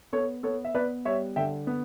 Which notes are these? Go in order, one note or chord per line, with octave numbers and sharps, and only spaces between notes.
B3 A4 C#5
B3 A4 C#5
E5
B3 B4 D5
G3 C#5 E5
D3 E5 G5
B3